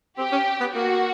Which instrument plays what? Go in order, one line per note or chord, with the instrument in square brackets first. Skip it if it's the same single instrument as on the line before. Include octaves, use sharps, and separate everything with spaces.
[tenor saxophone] C4 [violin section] G4
[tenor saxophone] C#4
B3
[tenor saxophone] A#3 [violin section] F#4